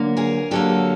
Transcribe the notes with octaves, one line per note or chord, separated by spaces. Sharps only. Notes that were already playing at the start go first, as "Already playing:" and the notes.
Already playing: D3 F#3 A#3
G#4 A#4
D3 F#3 A#3 G4 A4